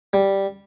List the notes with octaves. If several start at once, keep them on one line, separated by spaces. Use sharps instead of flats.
G3